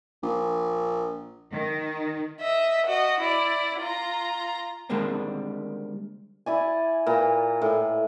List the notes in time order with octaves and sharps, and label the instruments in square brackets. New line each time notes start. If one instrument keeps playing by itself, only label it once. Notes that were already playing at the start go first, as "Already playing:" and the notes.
[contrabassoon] A#1
[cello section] D#3
[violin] D#5 E5
F#4 D#5
E4 D5
F4 A#5
[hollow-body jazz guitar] D3 D#3 G3 G#3 A#3 C4
[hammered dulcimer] E4 D5 G#5
A#2 B4 A#5
A2